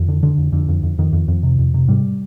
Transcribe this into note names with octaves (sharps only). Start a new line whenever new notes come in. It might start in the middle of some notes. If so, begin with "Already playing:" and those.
Already playing: F2 D#3
D3
D3
F2
F2 D3
F2
F2
F2 D#3
F2
F2
C3
F2
C3
G#2 G3